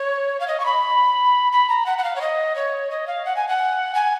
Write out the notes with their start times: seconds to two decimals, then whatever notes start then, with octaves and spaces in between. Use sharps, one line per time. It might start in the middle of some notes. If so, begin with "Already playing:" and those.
Already playing: C#5
0.40 F5
0.48 D#5
0.60 C#6
0.65 B5
1.52 B5
1.70 A#5
1.86 F#5
1.98 F#5
2.04 F5
2.16 C#5
2.21 D#5
2.56 C#5
2.91 D#5
3.07 F5
3.26 F#5
3.36 G#5
3.49 F#5
3.95 G#5